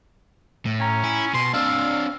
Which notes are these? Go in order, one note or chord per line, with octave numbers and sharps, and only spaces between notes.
A2
C#4 G5 A#5
E4 G#5
B2 C6
C4 D4 F5 E6